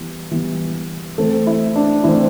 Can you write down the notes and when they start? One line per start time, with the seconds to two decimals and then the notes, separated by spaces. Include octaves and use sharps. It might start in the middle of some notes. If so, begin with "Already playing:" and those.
Already playing: E3 G3 B3
0.31 E3 G3 B3
1.18 E3 A3 C4 A4
1.47 E4
1.76 D4
2.04 E3 A3 C4 E4